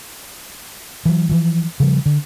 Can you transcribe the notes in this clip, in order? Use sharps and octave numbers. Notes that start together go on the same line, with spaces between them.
E3 F#3
E3 F3
C#3 F3 G3
D3